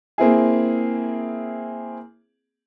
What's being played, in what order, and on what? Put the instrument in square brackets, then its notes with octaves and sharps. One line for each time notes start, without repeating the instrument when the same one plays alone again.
[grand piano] A#3 C4 E4 G#4